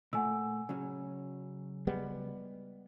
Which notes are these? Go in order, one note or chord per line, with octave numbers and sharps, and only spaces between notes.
A#2 A3 F#5 G#5 E6
C#3 F#3 C#4
G3 G#3 B3